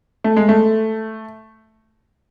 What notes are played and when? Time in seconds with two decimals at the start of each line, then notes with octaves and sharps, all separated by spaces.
0.24 A3
0.37 G#3
0.49 A3